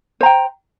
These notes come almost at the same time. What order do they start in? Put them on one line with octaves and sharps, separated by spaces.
C5 A#5 G5